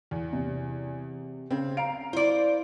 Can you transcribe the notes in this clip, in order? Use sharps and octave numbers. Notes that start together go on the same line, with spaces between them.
E2
C3
C#3 C4
F5 A#5 D7
E4 C5 D5